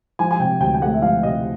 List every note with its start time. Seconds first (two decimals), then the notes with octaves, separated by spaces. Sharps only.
0.19 F3 G#5
0.31 G#5
0.40 C3 G5
0.60 D2 G5
0.74 G5
0.82 A3 F#5
0.94 E5
1.02 F3 F5
1.23 C3 D#5